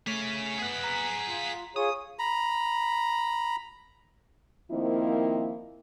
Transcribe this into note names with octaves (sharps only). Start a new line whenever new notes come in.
A3 G#4 C#5 B6
B3 G#4 F#5
A#5
F4
F4 G#4 C#5 D#6
A#5 B5
D#3 F3 A#3 C4 E4